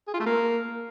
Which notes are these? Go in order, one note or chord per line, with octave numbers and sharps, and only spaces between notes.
G#4
F4
A3
A#3